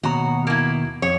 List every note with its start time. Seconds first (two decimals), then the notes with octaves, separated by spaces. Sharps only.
0.03 D#2 B2 F#4 C#5 A#5
0.47 A#3 E4
1.02 F2 C#5